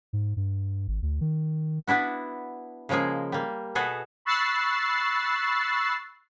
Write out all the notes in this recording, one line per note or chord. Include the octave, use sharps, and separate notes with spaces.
G#2
G2
G#1
D2
D#3
B3 D4 E4 F#4
C#3 F3 G#3 A#3 G#4
G3 A#3
B2 B3 F#4 G#4 A4
B5 C#6 E6 F#6 A6 C7